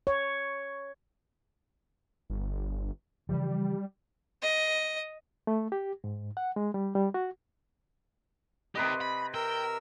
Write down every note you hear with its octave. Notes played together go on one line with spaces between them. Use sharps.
C#5
G1
C#3 E3 F3 G3
D#5
A3
G4
G#2
F#5
G#3
G3
G3
F#4
C3 G4 A#4 B4 D#5
B5
A#4 G5 E6